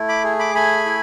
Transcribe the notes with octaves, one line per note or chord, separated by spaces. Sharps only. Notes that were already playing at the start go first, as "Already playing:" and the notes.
Already playing: A3 E4
B5 D6
G#4
B5 D6
A3 G#5 B5
E4